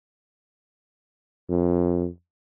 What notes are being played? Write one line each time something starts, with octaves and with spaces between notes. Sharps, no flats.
F2